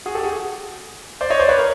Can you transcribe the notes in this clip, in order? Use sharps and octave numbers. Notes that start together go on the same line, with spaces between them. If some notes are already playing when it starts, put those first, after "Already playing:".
F#4 G#4
G4 A4
F#4 G#4
C5 D5
C#5 D#5
C5 D5
B4 C#5
A#4